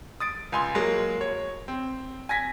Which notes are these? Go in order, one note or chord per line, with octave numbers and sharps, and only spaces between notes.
D#6 A6 D7
C#2 G#5 C6
F#3 G#3 A#3
C#5
C4
G#5 G#6 A#6 B6